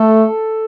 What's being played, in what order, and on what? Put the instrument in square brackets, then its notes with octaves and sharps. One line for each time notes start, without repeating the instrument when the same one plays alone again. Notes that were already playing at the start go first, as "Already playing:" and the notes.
Already playing: [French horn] A3 [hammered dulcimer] A4